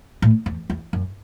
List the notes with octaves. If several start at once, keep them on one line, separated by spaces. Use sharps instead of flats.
A2
E2
E2
F#2